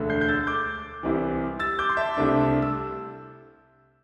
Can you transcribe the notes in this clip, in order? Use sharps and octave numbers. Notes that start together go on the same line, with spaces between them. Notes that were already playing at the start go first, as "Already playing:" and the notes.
Already playing: E1 D2 D3
G6 C7
G6
E6 A6
D6 G6
C2 C3 E3
E6 A6
D6 G6
C6
E5 A5
C2 C3 A3 D4
E6